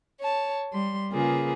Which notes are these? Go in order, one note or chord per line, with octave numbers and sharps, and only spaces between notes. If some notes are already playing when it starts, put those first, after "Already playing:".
C#5 A5
G3 C6
C#3 A#3 F4 G#4 B4